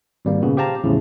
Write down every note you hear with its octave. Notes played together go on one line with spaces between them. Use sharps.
G#1 G3 A#3
A#2 C#3 B3
G4 C5 F5 A5 A#5
E2 A2 C#3 F3